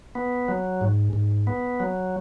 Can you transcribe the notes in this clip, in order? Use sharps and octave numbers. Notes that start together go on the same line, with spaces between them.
B3
F#3
G#2
G#2
B3
F#3